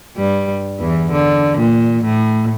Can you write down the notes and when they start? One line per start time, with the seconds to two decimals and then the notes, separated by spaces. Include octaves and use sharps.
0.17 G2 G3
0.80 E2 E3
1.11 D3
1.58 A#2
2.04 A2